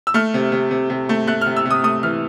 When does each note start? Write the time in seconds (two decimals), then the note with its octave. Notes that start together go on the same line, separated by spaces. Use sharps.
0.07 E6
0.14 A3 F6
0.34 C3
0.52 C3
0.71 C3
0.90 C3
1.09 A3
1.27 A3 F#6
1.41 F6
1.46 C3
1.56 E6
1.65 C3
1.71 D#6
1.84 A3 D#6
2.03 E3 F6